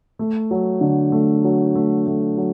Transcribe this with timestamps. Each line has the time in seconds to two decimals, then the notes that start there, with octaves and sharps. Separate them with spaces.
0.19 A3
0.51 F#3
0.81 D3
1.12 A3
1.44 F#3
1.75 A3
2.07 A3
2.37 F#3